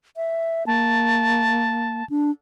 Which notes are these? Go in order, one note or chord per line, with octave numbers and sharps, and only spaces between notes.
E5
A#3 A5
D4